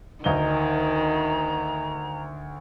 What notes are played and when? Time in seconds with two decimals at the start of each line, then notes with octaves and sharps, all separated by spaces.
0.24 D2 D#3 D#5 A#5 G7